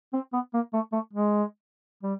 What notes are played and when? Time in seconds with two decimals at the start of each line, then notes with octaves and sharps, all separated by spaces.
0.13 C4
0.33 B3
0.54 A#3
0.73 A3
0.93 A3
1.13 G#3
2.03 G3